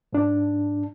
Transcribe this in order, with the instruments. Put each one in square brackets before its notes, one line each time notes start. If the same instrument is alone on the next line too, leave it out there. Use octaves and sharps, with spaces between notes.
[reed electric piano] G#2 D4